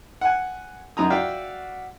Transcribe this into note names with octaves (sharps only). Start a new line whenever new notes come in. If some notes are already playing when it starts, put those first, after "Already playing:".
F#5 G#5
F#2 D#4 A#5 D#6
F#4 D5 E5 F5 G5